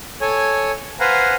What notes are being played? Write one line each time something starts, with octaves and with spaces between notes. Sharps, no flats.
A4 C#5 G#5
B4 C5 F5 F#5 G#5 A#5